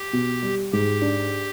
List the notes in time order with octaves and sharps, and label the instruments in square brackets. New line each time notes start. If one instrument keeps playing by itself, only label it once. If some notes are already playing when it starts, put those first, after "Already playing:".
Already playing: [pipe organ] G4
[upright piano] B2
G3
[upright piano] G#2 [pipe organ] G4
[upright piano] D4